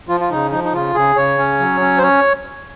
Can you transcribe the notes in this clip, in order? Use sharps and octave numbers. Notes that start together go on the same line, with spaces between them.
F3 F4
F4
C#3 D#4
F3 D#4
D#4
C#3 F4
C#3 G#4
C#3 C#5
C#4
F#3
C#4
C5
C#4 C#5